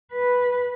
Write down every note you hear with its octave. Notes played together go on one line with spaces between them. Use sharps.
B4